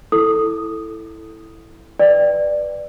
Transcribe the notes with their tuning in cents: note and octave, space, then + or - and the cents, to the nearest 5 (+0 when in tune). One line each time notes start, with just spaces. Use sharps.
E4 +0 A4 +0 D#6 +0
B4 +0 D5 +10 G5 +0